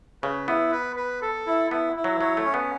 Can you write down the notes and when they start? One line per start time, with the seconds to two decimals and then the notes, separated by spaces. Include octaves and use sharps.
0.23 C#3 B4
0.48 B3 E4
0.72 B4
0.96 B4
1.22 A4
1.47 E4
1.71 B3 E4
1.96 E4
2.04 F#3
2.21 F#3 C#5
2.37 A3
2.45 C#4
2.54 B3